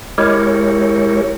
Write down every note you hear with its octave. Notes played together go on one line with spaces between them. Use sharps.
G#3 E4 G4 A#4 C#5